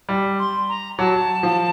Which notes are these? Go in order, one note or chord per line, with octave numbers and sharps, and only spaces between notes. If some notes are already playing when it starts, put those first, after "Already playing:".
G3
C6
A#5
F#3 A5
F3